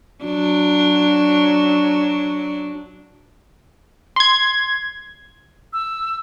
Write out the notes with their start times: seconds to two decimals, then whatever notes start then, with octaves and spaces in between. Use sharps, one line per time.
0.24 F#3 D4
4.16 C6 G#6
5.73 E6